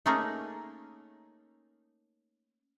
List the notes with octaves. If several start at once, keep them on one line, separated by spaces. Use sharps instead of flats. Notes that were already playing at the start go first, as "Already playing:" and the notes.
A3 A#3 C#4 D#4 G#4 A#4